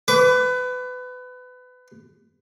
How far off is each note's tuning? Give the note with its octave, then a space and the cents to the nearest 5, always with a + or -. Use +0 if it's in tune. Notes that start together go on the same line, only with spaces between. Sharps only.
B4 +25 D6 -30